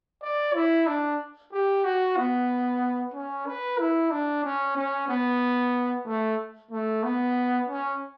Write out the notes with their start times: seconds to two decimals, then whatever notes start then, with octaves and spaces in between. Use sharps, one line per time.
0.22 D5
0.54 E4
0.87 D4
1.52 G4
1.84 F#4
2.17 B3
3.14 C#4
3.47 B4
3.79 E4
4.11 D4
4.44 C#4
4.77 C#4
5.08 B3
6.06 A3
6.71 A3
7.03 B3
7.68 C#4